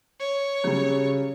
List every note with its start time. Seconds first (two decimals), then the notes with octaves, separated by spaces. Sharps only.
0.19 C#5
0.64 C#3 F#3 G3